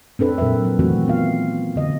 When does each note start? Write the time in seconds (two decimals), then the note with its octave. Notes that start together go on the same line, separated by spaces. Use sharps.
0.19 C4 D4 A4 B4
0.38 A#2 F#3 A#4 B4 E5
0.65 F#3
0.79 D#3 E3 A3 C4 F#4
1.08 B3 F4 F5
1.76 D3 D#5